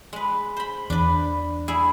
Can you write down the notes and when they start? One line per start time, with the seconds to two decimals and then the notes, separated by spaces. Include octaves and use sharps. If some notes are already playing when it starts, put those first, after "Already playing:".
0.13 G#3 B4
0.56 C5 B5
0.90 E2 D4 B4
1.68 E4 G#4 G#5